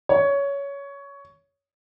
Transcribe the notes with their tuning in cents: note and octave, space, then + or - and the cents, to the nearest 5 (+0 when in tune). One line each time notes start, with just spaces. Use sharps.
C#5 +15